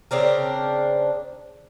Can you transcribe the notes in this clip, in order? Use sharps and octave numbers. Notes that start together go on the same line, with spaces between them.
C#3 C4 D4 A#4